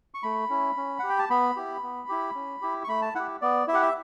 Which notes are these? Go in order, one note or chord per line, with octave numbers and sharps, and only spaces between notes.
C#6
A3 B5
C#4 E4
C#4
G4 F#5
G5
A5
B3 B5
E4 G4
B3
E4 G4
C#4
E4 G4
C#6
A3 B5
A5
E4 G4 F#5
B3 D5
E4 E5
G4 F#5
E5